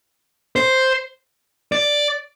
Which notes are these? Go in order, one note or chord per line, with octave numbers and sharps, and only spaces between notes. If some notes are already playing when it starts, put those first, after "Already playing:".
C5
D5